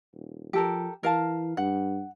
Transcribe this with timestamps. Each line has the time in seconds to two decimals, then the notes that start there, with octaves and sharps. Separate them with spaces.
0.13 D#1
0.53 F3 G4 A4 A#4
1.03 E3 A#4 F5 A5
1.57 G2 F#5